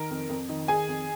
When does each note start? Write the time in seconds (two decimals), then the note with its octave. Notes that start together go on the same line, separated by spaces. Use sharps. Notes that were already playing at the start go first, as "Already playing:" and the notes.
Already playing: D#3 A#4
0.11 F2
0.29 F2
0.49 D#3
0.68 D#3 G#4 G#5
0.88 F2